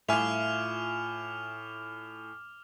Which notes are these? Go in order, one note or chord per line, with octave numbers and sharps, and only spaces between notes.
A2 F4 E5 G#5 D6 F6 F7